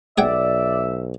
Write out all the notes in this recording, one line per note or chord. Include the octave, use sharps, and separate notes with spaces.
B1 G#4 D5 E5 F#5 G5